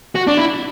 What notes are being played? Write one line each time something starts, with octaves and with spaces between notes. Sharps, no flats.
F#4
D4
E4